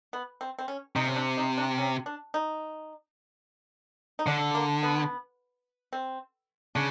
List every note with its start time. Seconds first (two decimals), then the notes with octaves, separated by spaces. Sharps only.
0.13 B3
0.41 C4
0.59 C4
0.68 C#4
0.96 C3 D#4
1.08 C#4
1.16 D4
1.37 D#4
1.58 D4
1.78 C#4
2.06 D4
2.34 D#4
4.19 D#4
4.27 D3 D4
4.55 A#3
4.83 B3
5.93 C4
6.75 C#3 D4